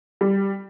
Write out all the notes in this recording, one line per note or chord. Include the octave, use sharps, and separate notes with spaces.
G3